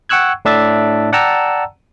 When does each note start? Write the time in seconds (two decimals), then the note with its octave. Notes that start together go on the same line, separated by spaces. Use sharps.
0.09 F#5 G5 C#6 E6 F#6 G#6
0.45 A2 D4 E5 A6
1.12 D5 F#5 G5 A5 A#5 E6